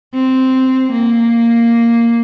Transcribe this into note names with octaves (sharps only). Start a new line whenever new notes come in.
C4
A#3